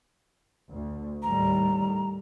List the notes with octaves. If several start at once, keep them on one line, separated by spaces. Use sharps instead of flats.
D2
D#2 A2 G3 A#5